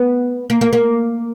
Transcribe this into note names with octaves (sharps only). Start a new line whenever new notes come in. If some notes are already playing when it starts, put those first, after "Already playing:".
Already playing: B3
A#3
A#3
A#3